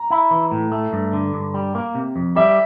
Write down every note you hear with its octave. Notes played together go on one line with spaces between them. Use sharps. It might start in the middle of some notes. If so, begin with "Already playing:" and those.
Already playing: A#5
E4
E3
A2
A3
G2
D3
G2
G3
A#3
C3
F2
G3 E5